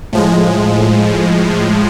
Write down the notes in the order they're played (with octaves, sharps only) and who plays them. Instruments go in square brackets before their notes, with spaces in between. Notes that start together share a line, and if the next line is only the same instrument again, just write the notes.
[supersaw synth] A2 F3 G#3